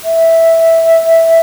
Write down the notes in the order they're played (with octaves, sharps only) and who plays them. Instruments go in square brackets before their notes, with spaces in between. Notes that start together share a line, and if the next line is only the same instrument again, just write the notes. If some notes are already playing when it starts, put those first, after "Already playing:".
[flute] E5